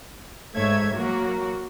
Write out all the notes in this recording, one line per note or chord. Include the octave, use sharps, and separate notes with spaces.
G#2 A3 C#5 E5 G#6
F#3 A#3 F#4